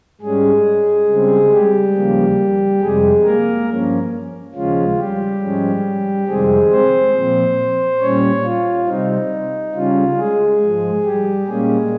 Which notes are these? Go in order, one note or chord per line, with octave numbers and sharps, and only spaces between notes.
G#2 G3 G#3 C#4 G#4
C#3 G3 C4
G3 G4
D#2 C#3 F3 A#3
F2 C3 G3 G#3 G#4
A#3 A#4
G2 F3 A#3 C#4
D#2 C#3 F3 G#3 C#4 F4
G3 G4
G#2 F3 G#3 C#4
F2 C3 D#3 G3 G#3 C4 G#4
C4 C5
A#2 F3 C4
A#2 G3 C#4 C#5
F4
C3 G3 C4 D#4
C#3 G3 C#4 F4
G#3 G#4
G#2 F3 G#3
G3 G4
A#2 G3 G#3 A#3 C#4 G#4